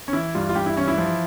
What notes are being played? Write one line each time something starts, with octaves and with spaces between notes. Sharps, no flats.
C#4
E3 E4
G2 F4
F4
G2 G4
E4
E3 C#4
E4
F3